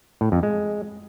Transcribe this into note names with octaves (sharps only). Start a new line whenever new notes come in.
A2
F2
G#3